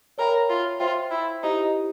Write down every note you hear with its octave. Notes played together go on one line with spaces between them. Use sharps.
A#4 C#5 E5 G5 B5
F4
F4 C5 E5 G5
E4
D#4 E4 G4 C5